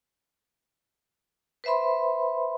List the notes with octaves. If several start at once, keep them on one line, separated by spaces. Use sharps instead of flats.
B4 C5 E5 B5 C6